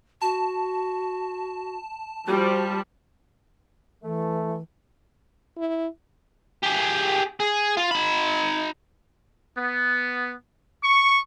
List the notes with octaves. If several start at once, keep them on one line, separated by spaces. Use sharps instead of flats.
F#4 A5
F3 G3 F#4
E3 A3
E4
G4 G#4
G#4
F4
D#4 B5
B3
C#6